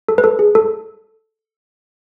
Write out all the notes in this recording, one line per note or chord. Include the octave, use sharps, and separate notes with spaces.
A4
B4
A4
G#4
A4